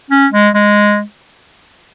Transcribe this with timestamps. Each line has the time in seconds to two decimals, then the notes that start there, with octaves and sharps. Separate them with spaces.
0.11 C#4
0.33 G#3
0.55 G#3